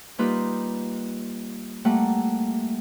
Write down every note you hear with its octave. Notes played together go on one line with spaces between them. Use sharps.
G3 A#3 D#4 F4 G4 B4
G3 A3 A#3 F#5